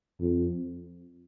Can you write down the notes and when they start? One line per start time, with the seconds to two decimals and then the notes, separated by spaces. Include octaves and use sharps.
0.20 F2